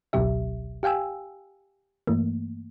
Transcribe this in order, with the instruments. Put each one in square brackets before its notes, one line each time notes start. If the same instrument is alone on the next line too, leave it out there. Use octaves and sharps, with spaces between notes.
[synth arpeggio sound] G#1 C#2 B2 F#3 G4 E5
G4 F5 G5 G#5 E6
G2 E3 A3 A#3